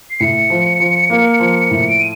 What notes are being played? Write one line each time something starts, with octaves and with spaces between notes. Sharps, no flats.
C7
A2 C#7
F3
F3
A#3
F3
A2
D7
D#7